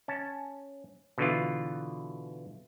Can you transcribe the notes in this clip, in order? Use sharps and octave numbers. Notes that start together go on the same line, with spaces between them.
C#4 A5
B2 D3 E3 F4